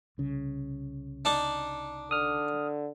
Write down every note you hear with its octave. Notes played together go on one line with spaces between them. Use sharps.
C2 C#3
D4 D#4 D5
D3 D#6 F6